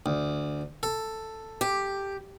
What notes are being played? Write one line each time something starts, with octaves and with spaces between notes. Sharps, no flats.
D2
A4
G4